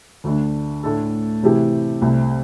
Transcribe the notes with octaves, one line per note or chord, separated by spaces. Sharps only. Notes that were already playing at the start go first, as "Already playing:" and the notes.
D2 D3 A3 D4
A2 A3 D4 A4
C3 E3 A3 E4 G4
C2 C3 A3